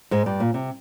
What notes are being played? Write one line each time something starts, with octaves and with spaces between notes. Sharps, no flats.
G#2 G#3
G2 G3
A#2
C3